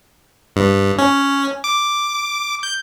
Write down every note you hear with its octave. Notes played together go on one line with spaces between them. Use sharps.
G2
C#4
D6
G6